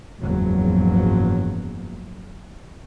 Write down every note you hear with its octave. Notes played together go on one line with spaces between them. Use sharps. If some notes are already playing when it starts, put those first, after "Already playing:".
F#1 E2 G#2 F3 F#3